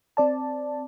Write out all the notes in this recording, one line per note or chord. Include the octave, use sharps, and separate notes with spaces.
C4 D5 A5